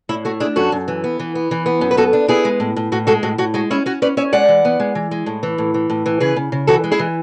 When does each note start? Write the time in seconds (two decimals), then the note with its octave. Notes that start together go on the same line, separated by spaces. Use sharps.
0.09 A2 E4
0.25 A3 F#4
0.40 D4 E4 G#4
0.56 F#2 F#4 A4
0.72 F#2
0.88 E3
1.04 B3
1.19 E3
1.35 B3
1.51 E3
1.66 B3
1.81 F#2
1.91 B4
1.97 B3 F#4 A4
2.13 D4
2.28 B3 E4 G#4
2.45 G#3
2.60 A2
2.76 A2
2.92 A2 F#4
3.07 G#3 F#4 A4
3.23 A2 F#4
3.38 A2 F#4
3.54 G#3 F#4
3.71 C#4 E4
3.86 C#4 F#4
4.02 C#4 B4 D5
4.17 C#4 C#5 E5
4.33 G#3 D5 F#5
4.48 E3
4.65 B3
4.80 G#3
4.95 E3
5.11 G#3
5.26 A2
5.43 E3
5.58 A2
5.74 E3
5.90 A2
6.06 E3
6.20 C#3 G#4 B4
6.36 C#3
6.52 C#3
6.67 E3 F#4 A4
6.84 G#3
6.92 E4 G#4
6.99 E3